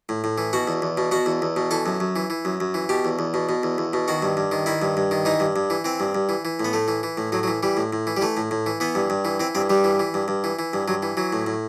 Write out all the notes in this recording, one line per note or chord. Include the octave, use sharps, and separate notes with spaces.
A2
A2
E3
B2 F#4
E2
E2
B2
B2 F#4
E2
E2
B2
E3 A4
F#2
F#2
E3
E3
F#2
F#2
E3
B2 G4
E2
E2
B2
B2
E2
E2
B2
D#3 F#4
G2
G2
D#3
D#3 E4
G2
G2
D#3
E3 D#4
G2
G2
E3
E3 C4
G2
G2
E3
E3
A2 B3
A2 A3
E3
E3
A2
A2 F#3
F#3
E3
E3 G3
A2
A2
E3
G3
E3 A3
A2
A2
E3
E3 B3
G2
G2
E3
E3 C4
G2 C4
G2 G3
E3
E3
G2
G2
E3
E3
G2
G2 F#3
E3
E3 F#3
A2
A2